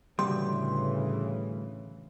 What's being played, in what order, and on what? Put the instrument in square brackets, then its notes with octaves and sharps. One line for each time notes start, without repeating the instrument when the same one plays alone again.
[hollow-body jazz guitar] D2 G3 [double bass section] A2 C#3 E3 [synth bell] C6